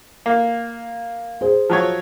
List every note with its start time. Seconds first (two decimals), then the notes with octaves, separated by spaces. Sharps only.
0.26 A#3
1.41 G#4 C5
1.70 F3 F#3 C#5